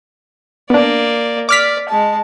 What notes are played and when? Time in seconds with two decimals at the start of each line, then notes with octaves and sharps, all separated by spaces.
0.70 A#3 B3 D4 D5
1.49 D5 D6 F6 B6
1.88 G#3 A5